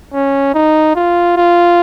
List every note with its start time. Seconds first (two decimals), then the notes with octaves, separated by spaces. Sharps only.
0.14 C#4
0.54 D#4
0.95 F4
1.37 F4